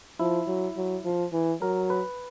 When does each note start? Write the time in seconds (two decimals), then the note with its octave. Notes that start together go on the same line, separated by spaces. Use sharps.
0.19 F3 E4
0.47 F#3
0.77 F#3
1.05 F3
1.33 E3
1.61 F#3 A#4
1.90 B4